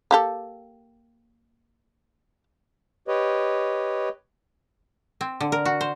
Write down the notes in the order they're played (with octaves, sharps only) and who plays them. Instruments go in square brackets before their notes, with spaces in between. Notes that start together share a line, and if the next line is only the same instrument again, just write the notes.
[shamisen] A#3 G4 A4
[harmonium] G4 B4 C#5 D#5
[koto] C4
D3
A#4
F#4
C5